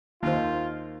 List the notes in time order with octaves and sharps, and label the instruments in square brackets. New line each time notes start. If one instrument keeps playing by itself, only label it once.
[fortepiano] D#2 [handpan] A#3 D#4 C5 [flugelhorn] F4